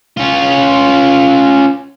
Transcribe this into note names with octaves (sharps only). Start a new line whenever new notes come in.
C#4 F4